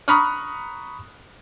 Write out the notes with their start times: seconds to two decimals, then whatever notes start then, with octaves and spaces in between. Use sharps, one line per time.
0.08 A#5 B5 C#6 D#6 F6 F#6